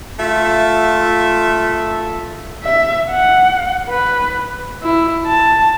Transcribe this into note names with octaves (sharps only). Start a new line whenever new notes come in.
A3 F4 E5
E5
F#5
B4
E4
A5